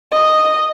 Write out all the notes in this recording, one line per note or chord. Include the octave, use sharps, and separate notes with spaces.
D#5